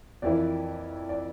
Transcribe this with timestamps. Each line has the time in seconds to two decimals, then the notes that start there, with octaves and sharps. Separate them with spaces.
0.22 F2 E3 A#3 E4 D5
1.09 D5